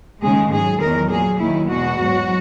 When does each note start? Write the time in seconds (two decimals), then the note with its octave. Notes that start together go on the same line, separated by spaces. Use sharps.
0.22 D#2 C#3 G#3 G#4
0.52 G#2 F#3 G#4
0.81 E2 D#3 F#3 A#4
1.10 A#2 F#3 G#4
1.39 D#2 D#3 F#3 E4
1.68 E2 B2 G#3 F#4
1.98 G#2 F#3